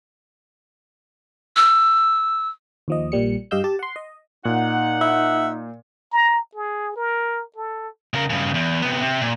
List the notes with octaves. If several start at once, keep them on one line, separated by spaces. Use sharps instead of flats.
E6
D#2 F3 D#5
A#1 A#2 G3 C#7
G2 G4 D#5 F5 E6 G6
G4 A5
F#5 C6
D#5
A#2 D#4 F#5
E5
A#5
G#4
A#4
A4
C#3 A#4
G2 C#3
E2
C3 B3
C3
A#2